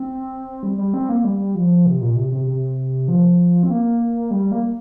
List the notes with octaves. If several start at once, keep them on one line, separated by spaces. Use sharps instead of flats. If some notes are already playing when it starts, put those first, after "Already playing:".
Already playing: C4
G3
G3
C4
A#3
G3
F3
C3
A#2
C3
C3
C3
F3
C4
A#3
G3
A#3